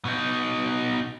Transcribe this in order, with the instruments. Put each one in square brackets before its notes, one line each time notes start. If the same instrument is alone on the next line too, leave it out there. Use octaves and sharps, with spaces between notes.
[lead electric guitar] B2 D#4